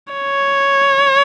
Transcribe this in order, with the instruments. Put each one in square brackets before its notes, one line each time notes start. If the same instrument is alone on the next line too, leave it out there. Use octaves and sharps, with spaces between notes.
[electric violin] C#5